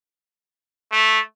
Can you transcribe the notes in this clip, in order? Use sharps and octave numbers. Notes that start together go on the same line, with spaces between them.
A3